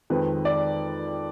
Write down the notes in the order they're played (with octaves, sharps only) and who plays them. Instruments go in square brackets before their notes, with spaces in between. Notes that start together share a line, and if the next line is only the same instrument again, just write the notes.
[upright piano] F2 D#3 G#3 C4 B4
D5